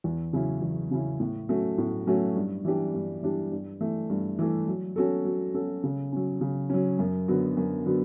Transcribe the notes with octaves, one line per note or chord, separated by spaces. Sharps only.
E2
C#3 F#3 C#4 E4
E2
C#3 F#3 C#4 E4
A2
F#3 A3 C#4 F#4
A2
F#3 A3 C#4 F#4
G2
E3 G3 D4 G4
G2
E3 G3 D4 G4
G2
E3 A3
G2
E3 A3
F#3
C#4 F#4 A4
F#3
C#4 F#4 A4
C#3
F#3 C#4
C#3
F#3 C#4
F#2
D3 F#3 B3 F#4
F#2
D3 F#3 B3 F#4